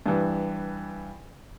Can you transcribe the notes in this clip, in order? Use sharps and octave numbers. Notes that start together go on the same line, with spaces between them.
G2 E3